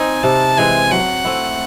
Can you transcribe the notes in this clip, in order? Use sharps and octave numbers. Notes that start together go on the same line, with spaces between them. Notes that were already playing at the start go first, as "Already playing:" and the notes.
Already playing: C4 D#4 G#5
C3 A5
E3 G#3 C4 G#5
F#3 F#5
A3 C4 E4